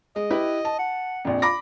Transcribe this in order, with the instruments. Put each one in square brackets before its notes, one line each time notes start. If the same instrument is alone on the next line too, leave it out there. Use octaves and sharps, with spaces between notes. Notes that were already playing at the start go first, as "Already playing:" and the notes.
[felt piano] G#3 [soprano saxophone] D#5
[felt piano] E4 G4 B4
A5
[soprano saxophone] F#5
[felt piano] A#1 F2
[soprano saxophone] F4 [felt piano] B5 D6 A#6